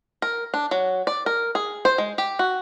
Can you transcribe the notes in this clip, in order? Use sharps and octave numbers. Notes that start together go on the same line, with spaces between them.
A#4
D4
F#3
D5
A#4
G#4
C5
G#3
G4
F#4